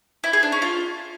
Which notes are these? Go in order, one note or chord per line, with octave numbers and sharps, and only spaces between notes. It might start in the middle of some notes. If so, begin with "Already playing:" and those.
E4
G#4
D4
C#4
F4